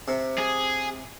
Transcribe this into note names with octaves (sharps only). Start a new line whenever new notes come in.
C3
G#4